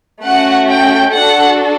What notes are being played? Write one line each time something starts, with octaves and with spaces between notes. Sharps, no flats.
A3 C#4 F#4 F#5
G5
D4 F#4 A4 F#5